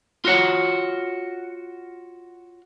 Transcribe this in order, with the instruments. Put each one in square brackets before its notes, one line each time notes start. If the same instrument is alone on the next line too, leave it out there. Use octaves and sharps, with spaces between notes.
[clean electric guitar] F4 F#4 C#5 F#5